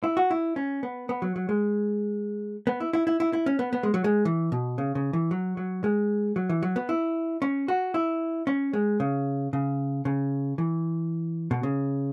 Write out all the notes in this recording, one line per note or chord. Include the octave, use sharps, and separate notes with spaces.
E4
F#4
E4
C#4
B3
B3
F#3
F#3
G#3
B3
E4
E4
E4
E4
E4
C#4
B3
B3
G#3
F#3
G#3
E3
B2
C#3
C#3
E3
F#3
F#3
G#3
F#3
E3
F#3
B3
E4
C#4
F#4
E4
C#4
G#3
C#3
C#3
C#3
E3
B2
C#3